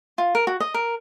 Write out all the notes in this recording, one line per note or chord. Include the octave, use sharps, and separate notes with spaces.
F4
A#4
F#4
D#5
A#4